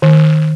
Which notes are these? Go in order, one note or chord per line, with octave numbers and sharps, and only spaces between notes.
D#3